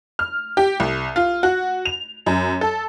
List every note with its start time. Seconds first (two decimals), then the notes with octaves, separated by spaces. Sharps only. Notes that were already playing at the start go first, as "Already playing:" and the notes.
0.19 F6
0.57 G4
0.80 C2
1.16 F4
1.43 F#4
1.85 F7
2.26 F#2
2.61 A4